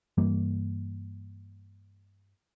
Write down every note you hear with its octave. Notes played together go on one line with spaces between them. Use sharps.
G2 E3 G3 A#3